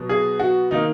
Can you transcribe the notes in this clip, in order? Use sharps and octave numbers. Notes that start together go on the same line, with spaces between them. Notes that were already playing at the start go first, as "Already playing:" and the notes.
Already playing: B2 F#3 B3
G#4
F#4
D#3 A#3 D#4